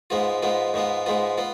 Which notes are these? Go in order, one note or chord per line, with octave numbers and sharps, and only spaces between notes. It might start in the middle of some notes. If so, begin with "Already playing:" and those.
G#2 G#3 B3 F4
G#2 G#3 B3 F4
G#2 G#3 B3 F4
G#2 G#3 B3 F4
B3 F4